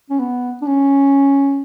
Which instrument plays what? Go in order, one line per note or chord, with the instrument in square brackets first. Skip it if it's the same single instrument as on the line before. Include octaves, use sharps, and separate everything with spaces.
[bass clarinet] C#4
B3
D4
C#4